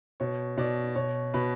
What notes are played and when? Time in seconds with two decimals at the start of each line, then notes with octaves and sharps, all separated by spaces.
0.20 B2 C#5
0.58 B2 D5
0.95 B2 C#5
1.34 B2 B4